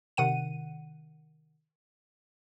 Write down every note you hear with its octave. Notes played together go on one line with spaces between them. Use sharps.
C3 D#3 F#5 D#7